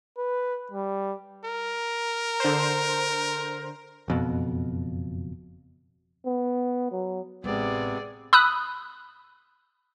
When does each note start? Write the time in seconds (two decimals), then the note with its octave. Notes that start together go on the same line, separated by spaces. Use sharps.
0.18 B4
0.71 G3
1.44 A#4
2.40 D3 C5
4.08 F#1 F2 B2
6.26 B3
6.92 F#3
7.44 A1 C3 G#3 B3 C4 G#4 D5
8.33 B5 D#6 E6 F#6